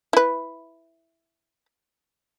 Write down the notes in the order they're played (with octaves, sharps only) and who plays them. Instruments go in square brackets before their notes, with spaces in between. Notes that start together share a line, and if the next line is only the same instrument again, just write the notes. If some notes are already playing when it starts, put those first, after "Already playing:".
[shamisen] E4 B4